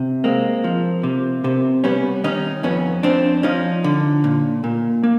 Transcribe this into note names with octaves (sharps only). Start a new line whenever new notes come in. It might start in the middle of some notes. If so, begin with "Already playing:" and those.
Already playing: C3
G#3 A#3 C4
F3
C3
C3
G3 B3 C#4
D#3 C#4 D#4
F2 B3 C#4
F2 C4 D4
F3 C#4 D#4
D3
A#2
A#2
A#3